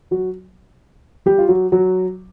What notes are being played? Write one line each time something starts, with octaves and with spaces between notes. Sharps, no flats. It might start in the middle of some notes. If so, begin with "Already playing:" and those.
F#3 F#4
G3 G4
F4
F#3 F#4
F#3 F#4